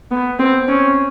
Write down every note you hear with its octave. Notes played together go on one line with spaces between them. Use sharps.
B3
C4
C#4